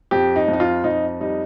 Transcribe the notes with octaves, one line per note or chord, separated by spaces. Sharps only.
F2 G4
D#4
F2
D#4
F4
F2 D#4
G3 D#4